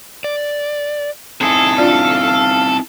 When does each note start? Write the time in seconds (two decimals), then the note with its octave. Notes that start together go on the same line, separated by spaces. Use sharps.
0.24 D5
1.41 C4 D#4 E4 G#4 A4
1.78 D4 F4 D5 F5